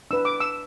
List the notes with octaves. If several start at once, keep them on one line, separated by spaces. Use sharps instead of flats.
D4 B4 E6
D6
E6